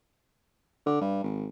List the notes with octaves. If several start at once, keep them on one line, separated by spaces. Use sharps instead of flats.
D3
G2
G#1